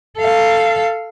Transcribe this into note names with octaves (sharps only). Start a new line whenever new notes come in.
A4 F5